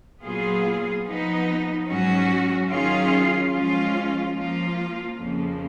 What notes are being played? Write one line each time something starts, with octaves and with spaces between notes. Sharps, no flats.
A#2 F#3 B3 F4 G#4
F3 B3 D#4
G#2 F#3 C#4 F#4
D#3 F#3 C#4 F4 G#4
F3 G#3 C#4 F4
F3 A#3 F4
F2 C#3 F3 A#3